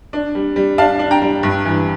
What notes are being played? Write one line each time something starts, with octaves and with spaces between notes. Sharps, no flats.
D4
G3
G3
D4 F5 A5
D4
G5 A#5
G3
G2
E3